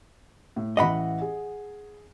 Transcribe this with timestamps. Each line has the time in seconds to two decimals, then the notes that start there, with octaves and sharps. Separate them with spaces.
0.56 A2
0.77 A1 E3 D#5 F#5 B5
1.21 G#4